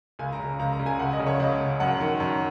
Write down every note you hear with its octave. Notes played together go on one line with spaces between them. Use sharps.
C#2 G#5
A#5
C#3
C#2 A#5
A#5
C#3
G#5
C#2 F#5
D#5
C#3
C#5
C#2 D#5
C#3
F#2 F#5
D#3
F#2